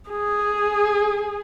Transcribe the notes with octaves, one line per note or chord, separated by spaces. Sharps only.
G#4